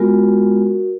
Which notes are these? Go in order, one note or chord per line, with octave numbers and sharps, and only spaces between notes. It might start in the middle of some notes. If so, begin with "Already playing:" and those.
Already playing: G#3 B3 F4 F#4 A#4